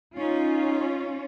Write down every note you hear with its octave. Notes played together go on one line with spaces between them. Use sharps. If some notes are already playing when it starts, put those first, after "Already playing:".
C#4 D#4 F4